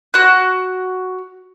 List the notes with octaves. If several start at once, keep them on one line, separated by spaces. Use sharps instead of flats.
F#4 F#6